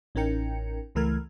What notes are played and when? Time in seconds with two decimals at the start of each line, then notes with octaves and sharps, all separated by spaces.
0.15 A1 C#4 D#4 A#4 G5 C#7
0.95 C#2 E3 A3 A#4 F6 G#6